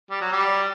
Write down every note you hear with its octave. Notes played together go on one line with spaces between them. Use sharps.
G3
F#3
G3